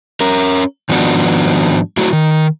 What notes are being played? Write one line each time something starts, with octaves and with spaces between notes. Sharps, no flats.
C#4 A#4
G#2 D#3 F3 B3 D4 F#4
F#3 A3 E4 F#4
D#3